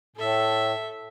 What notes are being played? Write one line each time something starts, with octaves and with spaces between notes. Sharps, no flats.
A2 A4 E5